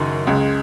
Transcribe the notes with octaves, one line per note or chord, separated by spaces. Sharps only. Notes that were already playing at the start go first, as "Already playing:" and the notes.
Already playing: F#1 F#2 D#3 F#3 D#4
C#2 C#3 G#3